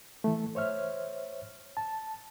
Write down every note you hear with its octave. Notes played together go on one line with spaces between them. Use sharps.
E3 A3
C5 C#5 E5 F6
A5